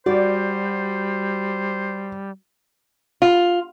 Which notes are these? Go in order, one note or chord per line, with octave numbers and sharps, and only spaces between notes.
G3 F#4 C5 D5
F4